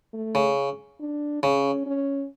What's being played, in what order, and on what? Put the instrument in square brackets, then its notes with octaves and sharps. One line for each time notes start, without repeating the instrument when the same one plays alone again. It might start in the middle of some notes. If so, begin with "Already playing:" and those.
[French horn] A3
[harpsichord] C#3
[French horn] D4
[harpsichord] C#3 [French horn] C#4
[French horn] C#4